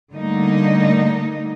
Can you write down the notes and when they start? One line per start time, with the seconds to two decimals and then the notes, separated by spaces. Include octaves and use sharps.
0.13 D3 G3 A3 A#3 D#4